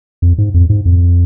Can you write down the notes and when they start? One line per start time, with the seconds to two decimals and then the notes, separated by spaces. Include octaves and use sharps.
0.22 F2
0.38 G#2
0.54 F2
0.70 G#2
0.85 F2